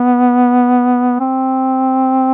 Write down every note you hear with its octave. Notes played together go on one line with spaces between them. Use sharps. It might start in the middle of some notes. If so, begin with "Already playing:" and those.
Already playing: B3
C4